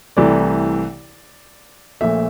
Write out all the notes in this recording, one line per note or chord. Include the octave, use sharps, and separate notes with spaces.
C2 C3 E3 A3 D5
A#1 A#2 A3 E5